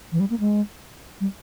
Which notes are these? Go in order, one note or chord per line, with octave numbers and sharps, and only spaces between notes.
E3
G3
A#3
G#3
G3